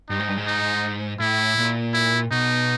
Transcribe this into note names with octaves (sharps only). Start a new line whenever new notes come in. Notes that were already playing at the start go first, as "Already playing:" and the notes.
G2 D#4
G#2
G2
G#2
D#4
A2 E4
A#2
E4
B2 D#4